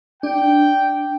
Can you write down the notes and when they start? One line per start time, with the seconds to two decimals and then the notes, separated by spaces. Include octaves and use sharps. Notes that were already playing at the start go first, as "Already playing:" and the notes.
0.23 D4 G5